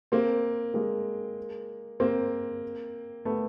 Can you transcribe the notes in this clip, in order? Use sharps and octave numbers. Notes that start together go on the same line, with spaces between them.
A#3 C4
G#3 A#3
A#3 C4
A3 B3